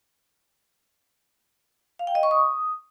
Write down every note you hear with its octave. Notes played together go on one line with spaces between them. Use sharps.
F5
G5
D#5
C#6
D#6